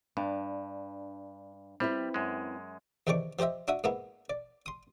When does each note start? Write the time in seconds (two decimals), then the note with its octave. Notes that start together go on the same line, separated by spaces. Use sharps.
0.17 G2 D4
1.80 G3 C4 E4 B4
2.14 F#2 G#3
3.07 E2 C3 D#3 D5 C#6 D6
3.39 F3 G4 C5 D#5 E5
3.68 D4 F#4 E5 D#6
3.84 G#2 A#3 B3 E4
4.30 D5
4.66 C6 D#6